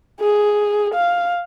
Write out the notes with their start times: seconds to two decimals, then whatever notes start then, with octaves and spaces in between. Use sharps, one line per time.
0.21 G#4
0.94 F5